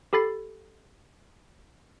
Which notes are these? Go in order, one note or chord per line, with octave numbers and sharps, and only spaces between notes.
G4 A4 B5 A6 C7